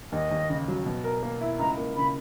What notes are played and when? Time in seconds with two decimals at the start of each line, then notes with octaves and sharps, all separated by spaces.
0.12 D#2 D#5
0.31 D#2
0.50 C#3
0.68 F#3
0.86 B2
1.04 A#4
1.23 A#3
1.41 E4
1.59 C#2 A#5
1.78 A#3
1.97 C#3 B5